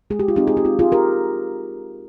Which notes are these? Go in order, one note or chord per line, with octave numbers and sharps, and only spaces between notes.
G#3 G#4
G4
F4
C4 D#4 G4
G#4
G4
C4 F4
F4 G#4
G4 A#4